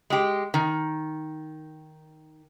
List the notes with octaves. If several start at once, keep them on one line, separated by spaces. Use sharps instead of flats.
G#3 G4
D#3